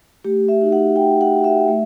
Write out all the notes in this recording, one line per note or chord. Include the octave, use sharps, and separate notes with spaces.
A3 G4
E5
D#4 F#4
F#5
A3 G5
F#5
D#4 F#4
E5
A3